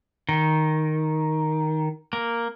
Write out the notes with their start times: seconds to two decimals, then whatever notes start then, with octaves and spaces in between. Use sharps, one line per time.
0.29 D#3
2.13 A#3